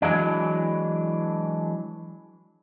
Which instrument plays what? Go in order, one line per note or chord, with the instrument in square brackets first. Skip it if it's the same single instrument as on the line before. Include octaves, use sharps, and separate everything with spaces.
[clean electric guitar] E3 F#3 G#3 D4